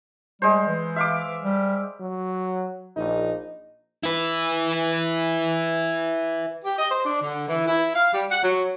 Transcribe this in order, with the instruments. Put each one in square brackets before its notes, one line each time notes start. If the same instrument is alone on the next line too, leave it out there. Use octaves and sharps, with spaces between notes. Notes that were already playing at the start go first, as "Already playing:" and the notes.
[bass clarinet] G3 [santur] G#3 C5
[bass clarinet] E3
[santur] E5 F5 D6
[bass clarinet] G3
[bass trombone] F#3
[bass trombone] A#1 [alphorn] D#4
[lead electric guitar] E4 B4
[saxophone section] G4
D#5
C5
D4
D3
E3
E4
F5
G3
F#5
F#3